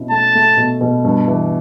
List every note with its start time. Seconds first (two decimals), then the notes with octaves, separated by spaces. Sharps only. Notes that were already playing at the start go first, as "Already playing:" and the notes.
Already playing: B2 C#4 E4
0.11 A3 A5
0.35 A3
0.57 B2
0.81 B2
1.05 G2
1.28 E3